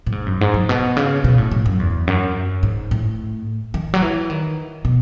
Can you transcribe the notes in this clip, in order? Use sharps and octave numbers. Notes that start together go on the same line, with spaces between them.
A2
G#2
F#2
G#2
F#3
A2
B2
C#3
B2
A2
A2
F#2
E2
F#2
G#2
A2
D#3
F#3
E3
D#3
B2